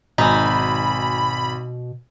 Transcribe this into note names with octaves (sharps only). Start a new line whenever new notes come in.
G#1 B2 D#4 G#5 B5